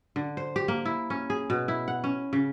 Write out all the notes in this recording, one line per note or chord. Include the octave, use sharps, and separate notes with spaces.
D3
C5
G4
A#3
E4
C#4
G#4
B2
E4
F#5
C#4
C#3